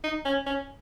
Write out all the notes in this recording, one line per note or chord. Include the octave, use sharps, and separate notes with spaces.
D#4
C#4
C#4